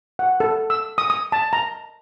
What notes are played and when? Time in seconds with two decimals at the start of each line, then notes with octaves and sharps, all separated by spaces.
0.19 F#5
0.40 A4
0.70 E6
0.98 D#6
1.10 D#6
1.32 A5
1.53 A#5